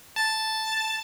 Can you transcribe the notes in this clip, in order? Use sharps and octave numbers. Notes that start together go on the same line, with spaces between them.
A5 A6